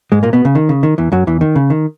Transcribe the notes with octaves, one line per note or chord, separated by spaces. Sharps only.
G#2 G#3
A#2 A#3
B2 B3
C#3
D#3
C#3
D#3
E2 E3
F#2 F#3
E2 E3
D#3
C#3
D#3